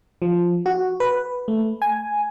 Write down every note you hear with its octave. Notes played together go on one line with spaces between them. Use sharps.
F3
F#4
B4
A3
G#5